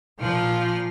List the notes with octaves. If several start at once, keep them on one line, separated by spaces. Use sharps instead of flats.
A#2 F3 F6